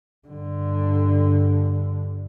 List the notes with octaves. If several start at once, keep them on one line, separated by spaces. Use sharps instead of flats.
G2 D3